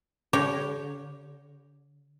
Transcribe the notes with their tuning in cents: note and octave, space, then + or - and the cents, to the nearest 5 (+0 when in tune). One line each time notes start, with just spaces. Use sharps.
D3 -45 G4 -5 C#5 +0